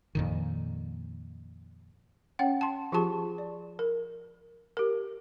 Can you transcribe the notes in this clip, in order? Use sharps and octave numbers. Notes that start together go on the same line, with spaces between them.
F2 A#2 D#3
C#4 C#5 F#5 G5
A5 C6
F3 F4 G4 G#4 A5 C#6
D5
A#4
G4 A#4